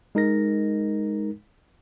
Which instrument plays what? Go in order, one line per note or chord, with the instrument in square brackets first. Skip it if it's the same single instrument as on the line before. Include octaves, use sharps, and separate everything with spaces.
[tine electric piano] G#3 D#4 A#4 A#6